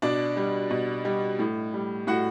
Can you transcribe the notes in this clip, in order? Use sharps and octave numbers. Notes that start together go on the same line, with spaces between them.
B2 D4 D5
G3
B2
G3
A2
G3
A2 F#4 F#5